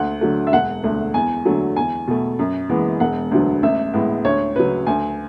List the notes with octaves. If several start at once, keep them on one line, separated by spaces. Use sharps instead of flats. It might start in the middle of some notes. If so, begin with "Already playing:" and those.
Already playing: D2 F#5
D3 F#3 A3
E5
E1 F#5
D2 D3 A3
E2 G#5
D3 F#3 A3
E2 G#5
B2 A3
F#2
E3 G#3 B3
E1 F#5
D2 D3 F#3 B3
A1 E5
A2 G#3 B3
D2 C#5
C#3 F#3 B4
D2 G#5